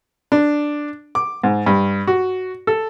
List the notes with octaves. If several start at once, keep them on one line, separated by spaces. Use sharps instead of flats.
D4
D6
G#2
G2
F#4
A4